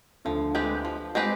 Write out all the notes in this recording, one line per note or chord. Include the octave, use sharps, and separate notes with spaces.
D2 D3 F3
G#3 C4 G4 B4
F3
G#3 C4 G4 B4